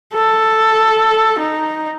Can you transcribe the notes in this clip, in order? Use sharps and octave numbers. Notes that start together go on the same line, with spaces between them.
A4
D#4